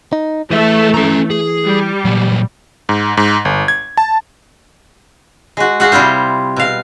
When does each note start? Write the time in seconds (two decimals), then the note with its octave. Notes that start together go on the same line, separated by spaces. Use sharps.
0.13 D#4
0.51 E3 A3 G#4 E5
0.94 C#4 A#5
1.30 G#4
1.65 G3
2.05 A#2 F#3
2.89 G#2
3.17 G#2
3.45 G1
3.68 G#6
3.97 A5
5.57 G#3 F#4
5.80 F#4 G#4 F5 F#5
5.92 C3 G3 E4 F4 C5
6.56 B2 F5